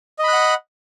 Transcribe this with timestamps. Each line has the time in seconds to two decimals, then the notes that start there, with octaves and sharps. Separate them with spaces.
0.19 D#5
0.24 B5
0.28 F#6
0.33 F#5